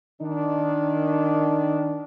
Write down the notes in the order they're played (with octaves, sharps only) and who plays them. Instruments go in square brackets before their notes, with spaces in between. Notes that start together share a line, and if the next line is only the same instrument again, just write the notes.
[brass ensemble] D#3 D4 D#4